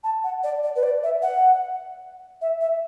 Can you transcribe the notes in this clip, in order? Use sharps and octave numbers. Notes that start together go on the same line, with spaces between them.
A5
F#5
D5
D5
B4
D5
E5
F#5
E5
E5